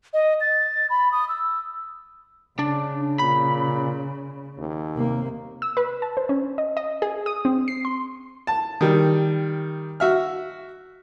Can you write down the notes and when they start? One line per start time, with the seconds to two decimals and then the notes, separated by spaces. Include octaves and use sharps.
0.14 D#5
0.41 A6
0.90 B5
1.12 D#6
1.29 E6
2.59 C#3 D4
3.19 A#2 B5
4.58 D#2
4.94 C3 A#3
5.62 E6
5.77 B4
6.02 A5
6.17 C5
6.29 C#4
6.58 D#5
6.77 D#5
7.02 G#4
7.26 D#6
7.45 C4
7.68 C7
7.85 C6
8.47 A5
8.81 D#3 G3
10.00 F#4 E5 F6